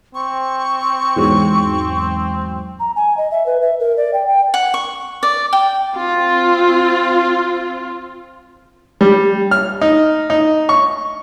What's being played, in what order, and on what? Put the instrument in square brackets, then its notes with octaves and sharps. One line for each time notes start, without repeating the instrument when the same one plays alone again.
[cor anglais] C4 [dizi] C#6
[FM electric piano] E2 G#2 F#3
[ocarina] A#5
G#5
D#5
E5
B4
E5
A#4
D5
G5
G5
[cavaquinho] F#5
C#6
D5
G5
[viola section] C4 F4
[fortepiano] G3
F6
D#4
D#4
C#6